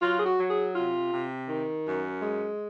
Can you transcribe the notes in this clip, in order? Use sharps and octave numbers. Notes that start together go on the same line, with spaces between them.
F#3 F4
G#4
F#4
F#3
G#4
C3 F4
C3
D#3
F#2
G#3